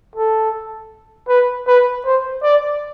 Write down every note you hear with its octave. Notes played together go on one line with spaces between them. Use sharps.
A4
B4
B4
C5
D5